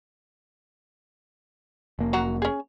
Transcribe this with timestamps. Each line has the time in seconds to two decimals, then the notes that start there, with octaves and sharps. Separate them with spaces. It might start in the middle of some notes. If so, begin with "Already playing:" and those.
1.99 F1 A#3
2.13 F#3 F#4 A#5
2.42 C#4 G#4